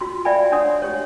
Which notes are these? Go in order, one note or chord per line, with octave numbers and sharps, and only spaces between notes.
F4 F#4 C6
D5 E5 F5 G5 G#5 B5
D4 C#5 E5 F#5 C6 D#6
G4 C#5